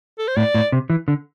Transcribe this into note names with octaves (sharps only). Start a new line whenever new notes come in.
A4
C5
A2 D5
A2
C3
E3
D3